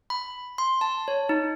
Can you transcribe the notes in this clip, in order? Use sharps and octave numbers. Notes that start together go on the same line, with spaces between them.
B5
C6
A5
C#5
D#4